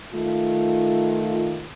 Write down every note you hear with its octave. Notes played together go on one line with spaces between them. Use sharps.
D#3 A3 F4